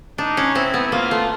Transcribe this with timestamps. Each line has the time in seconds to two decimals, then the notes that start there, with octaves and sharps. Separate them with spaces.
0.18 D4 D#4
0.37 C#4
0.55 C4 E4
0.74 B3
0.92 A#3 F4
1.11 A3